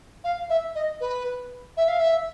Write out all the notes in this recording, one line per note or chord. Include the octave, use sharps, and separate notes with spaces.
F5
E5
D#5
B4
E5
F5
E5